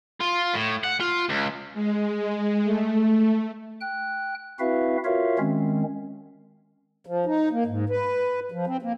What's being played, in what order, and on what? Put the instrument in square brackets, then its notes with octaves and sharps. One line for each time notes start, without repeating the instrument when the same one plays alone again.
[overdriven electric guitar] F4
A2
F#5
F4
C#2
[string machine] G#3
A3
[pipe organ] G5 F#6
C4 E4 F#4 B4 E5 F5
F4 F#4 A#4 C#5 E5 F5
D#3 G#3 C4 C#4
[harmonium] F3
D#4
A#3
G#2
B4
F3
C4
A#3